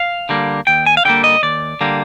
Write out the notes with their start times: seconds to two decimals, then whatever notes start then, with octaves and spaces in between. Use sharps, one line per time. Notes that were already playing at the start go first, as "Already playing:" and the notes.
Already playing: F5
0.29 D3 G3 A#3
0.67 D#2 G5
0.86 G#5
0.97 F5
1.05 D3 G3 A#3 G5
1.24 D#5
1.43 D#2 D5
1.81 D3 G3 A#3